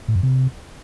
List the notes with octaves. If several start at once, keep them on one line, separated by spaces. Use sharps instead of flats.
A2
F#2
C3